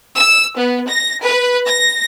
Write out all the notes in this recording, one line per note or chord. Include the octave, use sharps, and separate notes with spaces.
E6
B3
A#6
B4
A#6